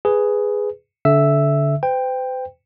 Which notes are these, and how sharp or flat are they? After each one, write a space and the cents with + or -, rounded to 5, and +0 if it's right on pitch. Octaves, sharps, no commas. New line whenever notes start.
G#4 +0 B4 +5
D3 -25 E5 +0 E6 +0
C5 -45 G5 +10